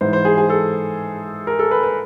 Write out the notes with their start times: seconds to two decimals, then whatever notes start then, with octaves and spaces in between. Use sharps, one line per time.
0.01 G#2 E3 C5
0.13 C5
0.25 G#4
0.38 G#4
0.50 A4
1.47 A#4
1.59 A4
1.71 B4
1.83 B4